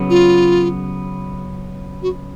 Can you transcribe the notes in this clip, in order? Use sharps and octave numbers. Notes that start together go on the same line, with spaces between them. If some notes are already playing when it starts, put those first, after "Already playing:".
Already playing: C#3 F#3 B3
F4
F#4